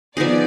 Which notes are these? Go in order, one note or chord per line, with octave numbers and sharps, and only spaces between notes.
F3 B3 D#4 G#4 D5